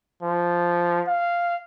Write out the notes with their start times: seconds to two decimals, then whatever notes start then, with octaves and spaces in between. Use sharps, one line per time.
0.23 F3
1.08 F5